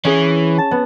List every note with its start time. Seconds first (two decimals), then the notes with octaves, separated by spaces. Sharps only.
0.05 E3 C#4 G#4
0.58 A5
0.71 B3